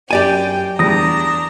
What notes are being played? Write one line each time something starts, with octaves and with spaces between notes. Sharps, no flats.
F#2 G4 D5 G5 G#5
E2 G3 D4 A5 A#5 D#6 A#6